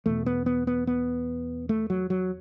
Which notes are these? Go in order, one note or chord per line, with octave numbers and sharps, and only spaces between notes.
E2 B2 A3
B3
B3
B3
B3
A3
F#3
F#3